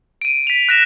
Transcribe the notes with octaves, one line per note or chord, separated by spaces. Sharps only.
D7 D#7
B6 F7
F#6 A#6 E7